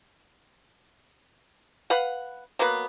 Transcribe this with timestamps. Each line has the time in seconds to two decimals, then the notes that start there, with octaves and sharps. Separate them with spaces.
1.90 B4 F5 F#5
2.59 F#3 A#3 B3 B4